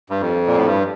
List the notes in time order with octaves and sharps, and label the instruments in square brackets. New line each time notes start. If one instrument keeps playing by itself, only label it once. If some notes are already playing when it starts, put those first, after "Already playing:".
[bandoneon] G2
F2
A#2
A2
G2